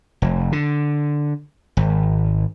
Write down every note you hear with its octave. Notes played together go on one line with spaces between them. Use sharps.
F1
D3
G#1